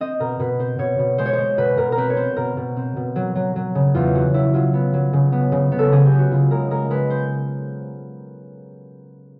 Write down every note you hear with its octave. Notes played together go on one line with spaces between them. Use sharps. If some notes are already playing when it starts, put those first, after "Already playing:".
C4 D#5
B2 A#4
B2 B4
C4 C5
B2 C#5
B2
G#3 C5
C#5
G#3 C5
B2 B4
B2 A#4
A#4
C4 B4
C#5
C4 C5
B2 A#4
B2
C4
B2
F#3
F#3
F#3
C#3
E2 F4
F#3 F#4
F#3 E4
F#3 F4
B3
F#3
C#3
B3
C#3
B3
A4
C#3 G#4
G4
B3
F#4
C#3 F4
G#3 A#4
G#3 A#4
G#3 B4
C5